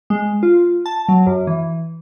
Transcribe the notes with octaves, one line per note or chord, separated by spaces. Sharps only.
G#3
F4
A5
F#3
F#2
E3